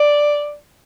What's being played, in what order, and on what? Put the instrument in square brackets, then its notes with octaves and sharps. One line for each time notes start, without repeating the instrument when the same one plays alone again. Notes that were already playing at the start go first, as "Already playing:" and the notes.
Already playing: [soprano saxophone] D5